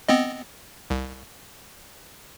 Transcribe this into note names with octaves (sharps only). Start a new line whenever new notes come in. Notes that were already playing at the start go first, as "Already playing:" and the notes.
B3 C4 D#5
C2